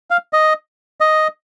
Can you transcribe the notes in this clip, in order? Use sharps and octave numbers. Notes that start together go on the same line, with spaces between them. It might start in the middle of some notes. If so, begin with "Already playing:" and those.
F5
D#5
D#5